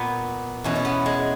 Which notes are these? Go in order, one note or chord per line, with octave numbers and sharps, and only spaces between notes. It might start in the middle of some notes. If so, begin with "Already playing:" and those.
Already playing: A#2 B3
E2 B2 C#4
C#4
B3
G#3